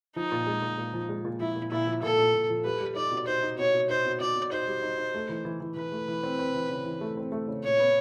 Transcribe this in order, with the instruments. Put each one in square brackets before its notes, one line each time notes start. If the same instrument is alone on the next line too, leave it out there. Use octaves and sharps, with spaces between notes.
[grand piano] F3 [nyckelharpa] D#4
[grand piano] A#2
G#3
A#2
A#2
F3
G#3
A#2
[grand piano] F3 [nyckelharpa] E4
[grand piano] A#2
[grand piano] A#2 [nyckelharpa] E4
[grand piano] F3
[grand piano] A#2 [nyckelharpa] A4
[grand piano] A#2
A#2
F3
[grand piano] G3 [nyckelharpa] B4
[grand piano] G3
[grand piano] D#4 [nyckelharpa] D5
[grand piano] B2
[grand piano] D#4 [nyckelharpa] C5
[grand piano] D#4
[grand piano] B2 [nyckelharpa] C#5
[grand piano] B2
[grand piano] D#4 [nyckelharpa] C5
[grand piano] B2
[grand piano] B2 [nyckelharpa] D5
[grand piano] B2
[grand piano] D#4 [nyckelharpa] C5
[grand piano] G3
D#4
D#4
A3
E3
E3
E3
[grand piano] E3 [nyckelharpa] B4
[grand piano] A3
E3
C4
C4
E3
C#3
E3
A3
C4
A3
C#3
[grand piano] A#2 [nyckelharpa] C#5
[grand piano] B3